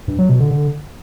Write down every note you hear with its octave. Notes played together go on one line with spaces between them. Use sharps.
G2
F#3
B2
D3
D3